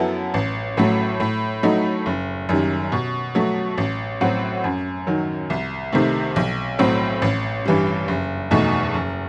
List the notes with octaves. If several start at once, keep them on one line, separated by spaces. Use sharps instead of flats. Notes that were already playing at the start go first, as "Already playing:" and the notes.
Already playing: F#2 F#3 B3 E4 A4
A1
A2 F#3 A3
A2
F#3 A3 D#4
F#1
F#2 D#3 G3
B2
F#3 A3
A1
A2 F#3 C4 F#4
F#2
D#3 F#3
C2
C3 D#3 A3 C4
B1
A2 F#3 C4
A1
G2 E3 G3
F#1
E2 B2 A3 D#4
F#1